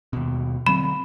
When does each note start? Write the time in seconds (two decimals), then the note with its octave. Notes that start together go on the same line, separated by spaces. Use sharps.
0.13 D#2 B2
0.66 D3 F#3 C4 B5